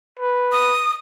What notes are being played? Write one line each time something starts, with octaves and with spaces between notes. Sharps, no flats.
B4
D#6